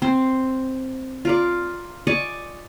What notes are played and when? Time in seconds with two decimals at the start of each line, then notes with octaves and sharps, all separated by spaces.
0.02 C4 C5
1.25 F4 A#4 D5
2.07 D5 D#5 G#5 C#6